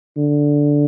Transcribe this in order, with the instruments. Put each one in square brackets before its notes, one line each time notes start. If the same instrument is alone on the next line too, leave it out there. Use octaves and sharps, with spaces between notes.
[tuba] D3